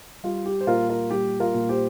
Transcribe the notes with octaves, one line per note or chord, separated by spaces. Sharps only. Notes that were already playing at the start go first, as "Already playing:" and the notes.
G3 F4
G4
C5
A#2 F4 A#4
F4 A#4
G3 G4
F4 A#4
A#2
G4 C5